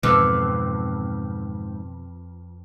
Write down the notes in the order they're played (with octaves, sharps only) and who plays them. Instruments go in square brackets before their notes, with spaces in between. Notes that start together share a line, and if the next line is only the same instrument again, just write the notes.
[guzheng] F2 [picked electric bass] G#2 [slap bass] B2 D#3 E3 [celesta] B4 D6 E6